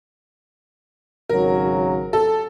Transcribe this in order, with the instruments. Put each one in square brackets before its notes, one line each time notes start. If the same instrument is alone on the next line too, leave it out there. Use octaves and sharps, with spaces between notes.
[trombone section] G#1 C#3 F#3 [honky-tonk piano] A#4
[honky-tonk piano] A4